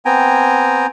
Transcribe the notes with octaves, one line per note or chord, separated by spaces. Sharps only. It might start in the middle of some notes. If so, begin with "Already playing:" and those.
B3 C4 G5 G#5 A#5